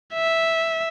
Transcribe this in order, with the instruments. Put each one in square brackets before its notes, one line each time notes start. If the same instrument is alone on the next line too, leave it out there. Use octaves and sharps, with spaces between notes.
[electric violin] E5